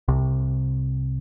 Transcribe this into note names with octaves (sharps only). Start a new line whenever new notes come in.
C2 C3